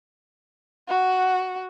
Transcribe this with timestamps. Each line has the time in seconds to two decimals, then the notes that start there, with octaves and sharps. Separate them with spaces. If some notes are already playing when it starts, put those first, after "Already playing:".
0.88 F#4 F#5